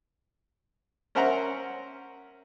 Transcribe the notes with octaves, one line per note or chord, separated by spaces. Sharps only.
C#4 A#4 C5 E5 F#5 A#5